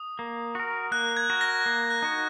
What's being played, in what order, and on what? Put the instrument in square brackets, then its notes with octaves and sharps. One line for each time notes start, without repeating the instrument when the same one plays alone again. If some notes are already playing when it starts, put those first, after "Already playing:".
Already playing: [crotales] D#6
[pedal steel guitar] A#3
F#4 A#4
[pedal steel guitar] A#3 [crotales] F#6
[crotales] G#6
[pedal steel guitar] F#4 A#4
[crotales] A#6
[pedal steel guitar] A#3
[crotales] F#6
[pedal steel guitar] D#4 F#4